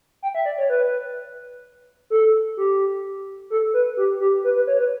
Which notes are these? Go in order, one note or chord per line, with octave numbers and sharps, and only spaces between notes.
G5
E5
D5
C#5
B4
A4
G4
A4
B4
G4
G4
B4
B4
C#5
B4